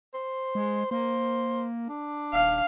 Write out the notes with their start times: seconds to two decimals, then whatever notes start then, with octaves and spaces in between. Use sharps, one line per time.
0.14 C5
0.55 G#3
0.91 A#3 C5
1.88 D4
2.33 D#1 F5